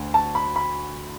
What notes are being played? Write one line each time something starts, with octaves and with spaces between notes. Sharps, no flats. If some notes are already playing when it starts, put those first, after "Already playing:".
Already playing: D2 D3
A5
B5
B5